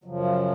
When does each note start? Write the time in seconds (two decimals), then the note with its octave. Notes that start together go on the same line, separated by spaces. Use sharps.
0.04 F#2 C#3 F3 F#3
0.25 F#3